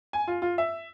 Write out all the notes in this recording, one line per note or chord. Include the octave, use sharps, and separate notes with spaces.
G#5
F4
F4
E5